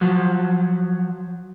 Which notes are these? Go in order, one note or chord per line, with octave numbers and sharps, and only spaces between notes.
F3 F#3